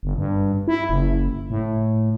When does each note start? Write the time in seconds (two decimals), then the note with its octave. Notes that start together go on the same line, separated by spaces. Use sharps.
0.03 G1
0.18 G2
0.68 E4
0.89 F#1
1.50 A2